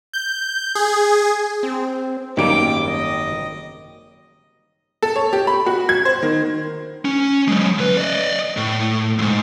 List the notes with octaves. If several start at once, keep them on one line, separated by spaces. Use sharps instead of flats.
G6
G#4
C4
G#1 F#2 D#3 G3 A#3 G5 D6 D7
D#5
A4
C#5
G4
B5
F#4
G#6
C5
D#3
C#4
F#3 G#3
D2 B4
D5 D#5
A2
F2 G#2